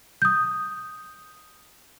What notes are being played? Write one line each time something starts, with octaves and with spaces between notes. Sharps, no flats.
D#6 G6